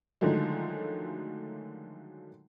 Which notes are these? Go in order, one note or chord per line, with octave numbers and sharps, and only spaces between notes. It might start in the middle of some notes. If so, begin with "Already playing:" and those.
D3 D#3 F3 F#3 G#3 A3